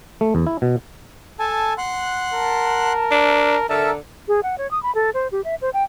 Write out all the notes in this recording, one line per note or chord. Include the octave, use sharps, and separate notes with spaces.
A3
E2
E4
B2
A4 G#5 A5
F#5 C6 F#6
A#4 A5
D4
D3 A4 A#4 E5 A5 A#5
G#4
F#5
C#5
D#6
B5
A4
C5
G4
E5
C5
G5